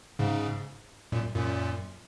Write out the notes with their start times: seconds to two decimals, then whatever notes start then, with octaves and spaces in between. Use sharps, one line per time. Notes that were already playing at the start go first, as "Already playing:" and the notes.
0.19 G#2 C#3
1.12 F#2 A#2
1.35 F#2 A#2